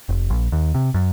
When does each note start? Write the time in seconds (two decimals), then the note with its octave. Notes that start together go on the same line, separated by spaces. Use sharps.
0.09 F1
0.30 A#1
0.52 D#2
0.74 C3
0.94 F#2